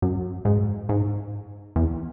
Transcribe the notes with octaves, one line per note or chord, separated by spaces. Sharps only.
F#2
G#2
G#2
E2